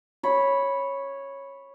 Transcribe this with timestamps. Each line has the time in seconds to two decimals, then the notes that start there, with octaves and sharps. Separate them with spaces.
0.23 C#5 B5